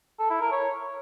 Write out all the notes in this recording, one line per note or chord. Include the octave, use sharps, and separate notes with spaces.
A4
E4
A#4
C#5